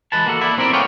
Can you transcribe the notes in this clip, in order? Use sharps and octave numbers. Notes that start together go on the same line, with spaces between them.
E3 G#3 B4 A5
A#3 F#4 A4
E4 D5
B1 C4 E4 A#4 D5 E5
A3 B3 C#4 F4 C#5 G5